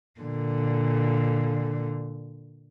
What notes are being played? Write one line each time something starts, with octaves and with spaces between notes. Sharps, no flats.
A#2 D3